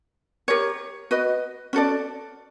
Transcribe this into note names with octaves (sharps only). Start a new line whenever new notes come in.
G4 A#4 C#5
F#4 B4 D#5
C#4 F#4 A4 D5